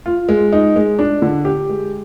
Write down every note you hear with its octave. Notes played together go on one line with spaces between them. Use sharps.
F4
G#3
D#4
G#3
D4
D3
G4
G#3